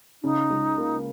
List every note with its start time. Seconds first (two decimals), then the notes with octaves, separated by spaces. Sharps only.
0.23 C#3 D#4
0.50 C#2
0.78 A#3